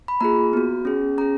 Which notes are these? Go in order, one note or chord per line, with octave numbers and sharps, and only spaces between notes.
B5
A#3 F4 G#4 A#5
B3 F#4
C#4 G#4
C#4 G#4 A#5